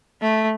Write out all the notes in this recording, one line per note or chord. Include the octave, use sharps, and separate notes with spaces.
A3